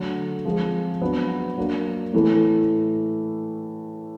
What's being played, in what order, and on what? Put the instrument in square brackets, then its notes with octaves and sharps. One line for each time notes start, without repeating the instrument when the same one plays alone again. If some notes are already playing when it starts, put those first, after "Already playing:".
Already playing: [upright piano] D3 F#3 A3
F3 G#3 C4
F#3 B3 D4
F#3 A#3 D4
A2 E3 A3